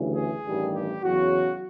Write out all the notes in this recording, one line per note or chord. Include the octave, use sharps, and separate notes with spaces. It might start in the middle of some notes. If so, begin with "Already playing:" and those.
Already playing: D2 C#3 E3 G3
G#4
A1 G2 D#3 G3
G4
E2 C#3 F#3 F#4